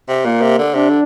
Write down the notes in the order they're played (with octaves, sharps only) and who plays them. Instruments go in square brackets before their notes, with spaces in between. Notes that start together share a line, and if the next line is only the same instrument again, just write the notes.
[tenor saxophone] C3
[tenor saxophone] A#2 [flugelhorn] A#3
[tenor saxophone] C3
D3
[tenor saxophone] C3 [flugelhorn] D4
[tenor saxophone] D3